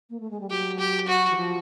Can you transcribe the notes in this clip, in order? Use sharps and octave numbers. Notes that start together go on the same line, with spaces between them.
A#3
A3
G#3
G3
F#3 G4
G4
F#4
E3
F3